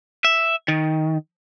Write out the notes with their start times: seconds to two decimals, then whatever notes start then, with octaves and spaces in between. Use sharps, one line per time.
0.25 E5
0.68 D#3